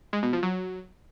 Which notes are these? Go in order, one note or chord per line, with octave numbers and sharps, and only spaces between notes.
G#3
B2
F3
F#3